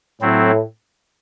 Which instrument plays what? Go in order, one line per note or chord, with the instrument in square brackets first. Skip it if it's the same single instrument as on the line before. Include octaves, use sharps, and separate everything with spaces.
[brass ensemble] A2 [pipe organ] F#3 C4 E4